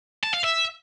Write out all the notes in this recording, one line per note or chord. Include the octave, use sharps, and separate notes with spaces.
A5
F5
E5